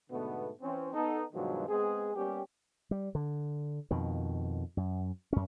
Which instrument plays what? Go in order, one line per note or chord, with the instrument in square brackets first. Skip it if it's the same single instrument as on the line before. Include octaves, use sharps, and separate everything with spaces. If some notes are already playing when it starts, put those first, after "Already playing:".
[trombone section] G#2 B2 D3 A3 B3
E3 C4 C#4
B3 D#4 A4
G2 B2 D#3 F3 F#3 G#3
G#3 B3 C4 G#4
G3 A#3 B3 C#4 G4
[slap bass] G3
D3
F2 B2 D#3
F#2
F#2 C#4